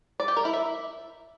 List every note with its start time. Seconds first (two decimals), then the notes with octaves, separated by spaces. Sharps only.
0.20 D5
0.28 G4
0.37 A#4
0.45 E4
0.53 E5